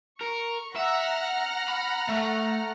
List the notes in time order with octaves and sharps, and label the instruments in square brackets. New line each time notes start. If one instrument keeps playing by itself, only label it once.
[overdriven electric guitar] A#4 [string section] C#6
[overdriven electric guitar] E5 [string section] F#5 A#5 F6
[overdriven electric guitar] B5
A3